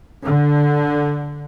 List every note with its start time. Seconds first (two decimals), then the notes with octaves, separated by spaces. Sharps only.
0.24 D3